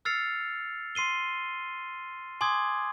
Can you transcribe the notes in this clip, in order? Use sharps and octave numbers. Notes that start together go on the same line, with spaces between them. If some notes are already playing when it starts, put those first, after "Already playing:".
E6 F6 A6 C7 C#7 F7
C6 C7 D#7 G7
G#5 C6 D6 D#6 G#6